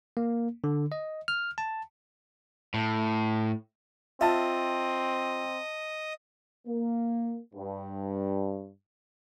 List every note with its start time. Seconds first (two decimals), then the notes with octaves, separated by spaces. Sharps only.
0.17 A#3
0.64 D3
0.92 D#5
1.28 F6
1.58 A5
2.74 A2
4.21 C4 F4 D#5 E5 A5
6.68 A#3
7.54 G2